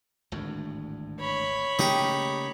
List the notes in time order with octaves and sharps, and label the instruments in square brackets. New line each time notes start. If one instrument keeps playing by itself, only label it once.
[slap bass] G#1 D2 A2
[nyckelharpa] C#5 B5
[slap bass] C#3 A3 A#3 [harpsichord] D#4 G4